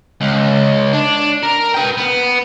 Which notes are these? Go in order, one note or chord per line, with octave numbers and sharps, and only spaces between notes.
C#2
D4
A#4
B4 G5
B3